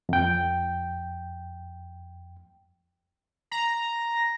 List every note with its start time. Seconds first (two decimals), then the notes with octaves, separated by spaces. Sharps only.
0.09 F2 G5
3.52 A#5